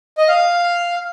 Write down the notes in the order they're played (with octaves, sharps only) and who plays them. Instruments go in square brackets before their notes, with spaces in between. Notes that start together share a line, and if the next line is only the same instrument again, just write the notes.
[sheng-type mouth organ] D#5
F5